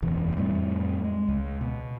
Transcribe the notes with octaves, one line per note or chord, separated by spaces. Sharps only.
F#1 E2 B2 E3
F2 A2 G3 A3
G#3
C#2
B2